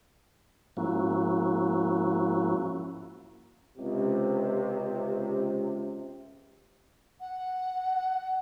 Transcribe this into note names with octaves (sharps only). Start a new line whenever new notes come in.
G#2 F3 A#3 C#4 E4 F#4
C#2 C3
F#5